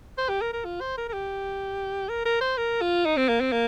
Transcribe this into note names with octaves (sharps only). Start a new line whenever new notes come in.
C5
G4
A#4
A#4
F4
C5
A#4
A#4
G4
A#4
A#4
C5
A#4
F4
D#4
C4
A#3
C4
A#3